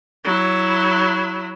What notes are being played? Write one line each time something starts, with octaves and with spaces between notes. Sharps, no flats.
F#3 E4